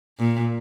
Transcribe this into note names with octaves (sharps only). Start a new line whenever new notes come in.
A#2